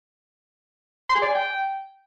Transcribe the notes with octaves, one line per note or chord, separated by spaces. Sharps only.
C6
G#4
D5
G#5
G5